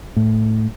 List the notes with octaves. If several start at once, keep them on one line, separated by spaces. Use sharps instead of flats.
A2